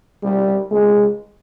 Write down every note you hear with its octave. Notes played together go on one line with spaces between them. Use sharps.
G3
G#3